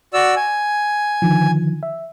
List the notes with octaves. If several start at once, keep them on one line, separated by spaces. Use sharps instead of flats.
F#4 D5 E6
G#5
D3 D#3 F3
E5